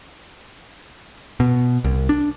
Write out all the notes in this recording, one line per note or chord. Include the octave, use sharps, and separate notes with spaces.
B2
C2
D4